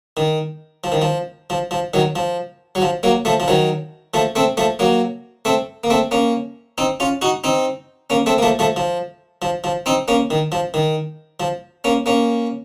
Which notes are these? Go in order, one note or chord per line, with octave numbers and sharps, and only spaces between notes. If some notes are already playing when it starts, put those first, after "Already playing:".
D#3
F3
D#3
F3
F3
F3
D#3 F#3
F3
F#3
F3
F#3 A#3
F3 A3
F3
D#3 F#3
F3 A3
A3 C4
F3 A3
F#3 A#3
A3 C4
A#3
A3 C4
A#3 C#4
C4 D#4
C#4 F4
D#4 F#4
C4 D#4
A#3 C#4
A3 C4
A#3
F3 A3
F3 A3
F3
F3
F3
C4 D#4
A#3 C#4
D#3
F3
D#3
F3
A#3 C#4
A#3 C#4